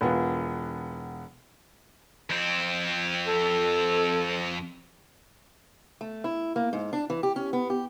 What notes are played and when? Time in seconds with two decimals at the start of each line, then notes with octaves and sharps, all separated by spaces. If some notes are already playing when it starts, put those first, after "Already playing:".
0.01 E1 B3 F4
2.30 F2 C4
3.27 A4
6.01 A3
6.24 E4
6.56 A#3
6.73 G#2
6.93 D4
7.10 E3
7.23 G4
7.36 C#4
7.53 B3
7.70 G4